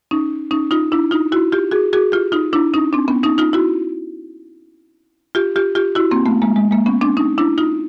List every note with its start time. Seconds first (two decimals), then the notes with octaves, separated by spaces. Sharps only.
0.11 C#4 D#4
0.51 C#4 D#4
0.71 D#4 F4
0.92 D4 E4
1.11 D#4 F4
1.32 E4 F#4
1.52 F4 G4
1.72 F#4 G#4
1.93 F#4 G#4
2.12 F4 G4
2.32 D#4 F4
2.53 D4 E4
2.74 C#4 D#4
2.93 C4 D4
3.08 B3 C#4
3.23 C#4 D#4
3.38 D#4 F4
3.53 E4 F#4
5.35 F4 G4
5.56 F4 G4
5.75 F4 G4
5.95 E4 F#4
6.11 A#3 C4
6.26 A3 B3
6.42 G#3 A#3
6.56 G#3
6.71 G#3 A#3
6.86 B3 C#4
7.01 C4 D4
7.17 C#4 D#4
7.38 D4 E4
7.58 D#4 F4